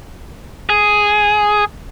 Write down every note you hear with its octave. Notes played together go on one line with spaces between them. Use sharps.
G#4